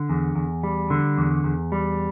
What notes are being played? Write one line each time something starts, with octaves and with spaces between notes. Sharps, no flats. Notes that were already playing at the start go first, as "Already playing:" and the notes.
Already playing: D3
E2
E2
G3
D3
E2
E2
G3